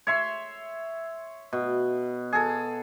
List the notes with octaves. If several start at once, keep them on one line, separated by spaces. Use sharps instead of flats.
C#5 E5 C6
B2
G#4 A4